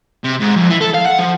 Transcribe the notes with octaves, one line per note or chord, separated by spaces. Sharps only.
C3
G#2
F2
E3
A4
F5
F#5
F3